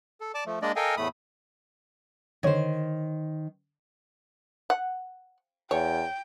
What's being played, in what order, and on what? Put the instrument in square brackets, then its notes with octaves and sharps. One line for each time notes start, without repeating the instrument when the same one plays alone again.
[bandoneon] A4
D5 A5 D6
F3 A3
G#3 A#3 D4 D5 D#5
A4 A#4 D#5 F5 G5 G#5
E2 A2 A3 B5 D#6
[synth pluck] D3 C#5 G#6 [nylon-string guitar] D#3 C5
[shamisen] F#5
[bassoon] E2 [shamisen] C#5 [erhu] G5